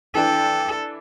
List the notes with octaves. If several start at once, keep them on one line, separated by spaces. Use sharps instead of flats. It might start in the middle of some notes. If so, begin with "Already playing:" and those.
E3 D4 A4 G5